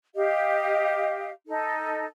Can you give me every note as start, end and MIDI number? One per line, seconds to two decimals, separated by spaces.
0.15 1.30 67
0.15 1.30 75
0.15 1.30 77
1.47 2.05 63
1.47 2.05 69